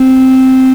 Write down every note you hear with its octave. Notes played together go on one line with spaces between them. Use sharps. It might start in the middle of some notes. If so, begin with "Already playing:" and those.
Already playing: C4